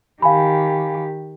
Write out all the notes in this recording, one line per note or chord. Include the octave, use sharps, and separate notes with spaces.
D#3 G4 F5 G#5 B5